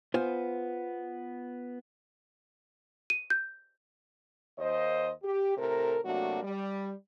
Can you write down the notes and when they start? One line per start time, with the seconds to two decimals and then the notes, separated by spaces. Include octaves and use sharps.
0.14 B3 F4 C5 G#5
3.10 D#7
3.30 G6
4.58 D#2 C5 D#5
5.23 G4
5.57 A2 C3 A4 A#4
6.05 C3 F#3 A3 A#3 D4 F#4
6.43 G3